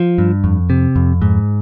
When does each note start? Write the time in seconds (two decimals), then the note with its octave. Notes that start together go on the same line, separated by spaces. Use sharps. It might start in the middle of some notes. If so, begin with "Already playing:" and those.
Already playing: F3
0.18 G2
0.44 F2
0.70 C3
0.96 F2
1.22 G#2